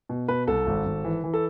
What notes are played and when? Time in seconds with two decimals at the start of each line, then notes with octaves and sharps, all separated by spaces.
0.09 B2
0.28 B2 B4
0.47 C2 A4
0.67 G#1
0.86 G#1
1.05 E3
1.24 E3
1.34 A4